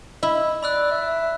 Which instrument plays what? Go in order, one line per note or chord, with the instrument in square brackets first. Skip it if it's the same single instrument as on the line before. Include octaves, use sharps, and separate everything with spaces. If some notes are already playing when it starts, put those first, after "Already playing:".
[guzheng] E4 [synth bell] D#5
[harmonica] D5 [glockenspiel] B5 E6 F#6
[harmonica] E5